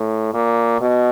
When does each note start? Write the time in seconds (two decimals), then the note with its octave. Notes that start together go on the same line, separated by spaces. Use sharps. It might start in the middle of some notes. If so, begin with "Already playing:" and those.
Already playing: A2
0.34 A#2
0.81 B2